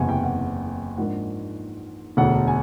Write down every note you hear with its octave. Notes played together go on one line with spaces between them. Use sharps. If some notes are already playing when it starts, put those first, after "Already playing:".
Already playing: F#1 E2 C3 F#5 G#5
G5
F#5
G#2 F3 A#3 D4 F#5
E1 D2 D3 F#5
G#5